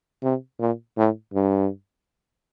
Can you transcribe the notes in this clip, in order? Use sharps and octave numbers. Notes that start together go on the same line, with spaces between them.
C3
A#2
A2
G2